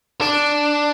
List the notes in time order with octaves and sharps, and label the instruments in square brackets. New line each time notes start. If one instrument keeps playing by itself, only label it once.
[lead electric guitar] D4